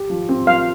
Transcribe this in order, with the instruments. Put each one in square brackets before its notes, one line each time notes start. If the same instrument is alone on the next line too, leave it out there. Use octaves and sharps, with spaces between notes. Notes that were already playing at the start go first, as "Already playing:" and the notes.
Already playing: [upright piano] G4
F3
C4
[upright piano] F3 [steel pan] F5